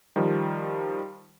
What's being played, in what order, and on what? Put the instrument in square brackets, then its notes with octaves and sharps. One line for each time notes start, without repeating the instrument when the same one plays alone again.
[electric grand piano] D#3 F3 G3